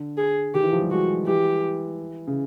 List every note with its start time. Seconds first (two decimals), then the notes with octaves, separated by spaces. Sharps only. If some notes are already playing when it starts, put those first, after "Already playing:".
Already playing: D3
0.17 G#4
0.54 D#3 G4
0.63 E3
0.72 F3
0.82 G3
0.91 G#3 F#4
1.27 E3 G4
2.27 C#3